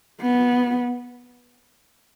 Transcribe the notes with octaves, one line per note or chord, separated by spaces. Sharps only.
B3